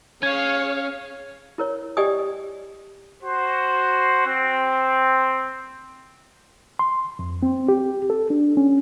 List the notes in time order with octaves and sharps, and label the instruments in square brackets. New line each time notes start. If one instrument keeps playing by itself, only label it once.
[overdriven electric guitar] C#4 [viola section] G#4 C#5 F5 [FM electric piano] G#6
[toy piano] E4 A#4 C#5
G4 D5 D#5 G5 G#5 D#6
[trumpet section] F#4 C5
C4
[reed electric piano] C6
F2
C4
G4
A4
D4
C#4